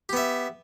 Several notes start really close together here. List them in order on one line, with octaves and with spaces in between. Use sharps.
G4 B3 E5